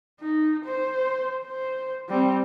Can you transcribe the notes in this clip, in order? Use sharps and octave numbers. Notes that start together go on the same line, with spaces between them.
D#4
C5
C5
G3 C4